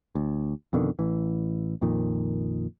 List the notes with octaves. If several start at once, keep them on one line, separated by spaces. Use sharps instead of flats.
D2
F2 B2 D3 D#3
A1 E3
A#1 F2 A#2 D#3